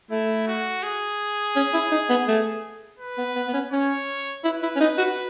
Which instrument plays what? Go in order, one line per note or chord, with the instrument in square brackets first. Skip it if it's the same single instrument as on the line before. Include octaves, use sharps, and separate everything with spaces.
[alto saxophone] A3 [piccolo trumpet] E4
[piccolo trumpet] F#4
G#4
[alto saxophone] C#4
E4
D#4
B3
A3
[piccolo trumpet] B4
[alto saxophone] B3
B3
B3
C#4
[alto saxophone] C#4 [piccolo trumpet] C#5
[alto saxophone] E4 [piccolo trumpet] B4
[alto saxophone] E4
C#4
D#4
F#4